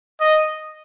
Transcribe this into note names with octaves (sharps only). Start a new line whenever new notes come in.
D#5